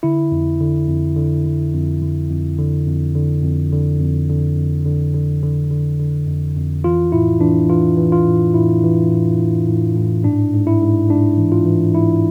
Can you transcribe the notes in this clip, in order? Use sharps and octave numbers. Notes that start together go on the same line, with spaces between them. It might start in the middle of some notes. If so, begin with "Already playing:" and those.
D3 E4
F2
D3
F2
D3
D3
F2
D3
F2
D3
F2
D3
F2
D3
F2
D3
F2
D3
D3
D3
D3
D3
F2
F2
E3 F4
A2 E4
E3 D4
E3 F4
E3
F4
A2
A2 E4
E3
A2
A2
A2
A2
G#2 D4
G#2
E4
G#2
G#2 D4
E3
F4
E3
G#2 E4